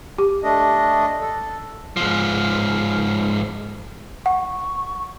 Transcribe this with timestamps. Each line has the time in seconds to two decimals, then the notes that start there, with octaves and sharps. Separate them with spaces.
0.18 G4
0.43 A3 D4 D#5
1.21 A4
1.97 G#2 F3
4.26 F#5 C#6